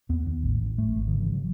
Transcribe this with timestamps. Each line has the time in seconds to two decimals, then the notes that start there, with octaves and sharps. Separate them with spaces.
0.09 D#2 B3
0.26 D#2
0.44 A1
0.61 A1
0.78 G#1 A3
0.96 G#1
1.08 D#3
1.13 C#3
1.20 E3
1.33 F#3